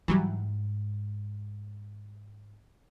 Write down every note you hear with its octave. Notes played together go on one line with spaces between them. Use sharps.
G#2 E3 F#3 G3